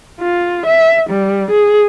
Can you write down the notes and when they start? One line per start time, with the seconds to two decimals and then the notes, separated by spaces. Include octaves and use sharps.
0.20 F4
0.67 E5
1.10 G3
1.51 G#4